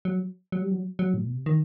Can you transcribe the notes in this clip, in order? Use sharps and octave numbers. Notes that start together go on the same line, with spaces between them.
F#3
F#3
G3
F#3
F#3
A2
B2
C3
D#3